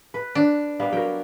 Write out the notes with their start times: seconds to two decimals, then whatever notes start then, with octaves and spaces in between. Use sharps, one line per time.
0.14 B4
0.35 D4
0.79 G3 A#3 B3
0.92 F#3 A#4 G5